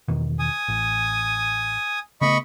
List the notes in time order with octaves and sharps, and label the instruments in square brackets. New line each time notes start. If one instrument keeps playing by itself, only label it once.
[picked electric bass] E2 B2 D#3
[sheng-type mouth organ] G#5 D#6
[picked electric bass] A1
[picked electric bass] C#3 A3 B3 [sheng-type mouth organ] D#5 B5 C#6